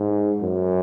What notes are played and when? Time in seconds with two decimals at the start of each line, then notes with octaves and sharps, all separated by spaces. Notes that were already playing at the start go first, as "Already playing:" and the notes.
Already playing: G#2
0.41 F#2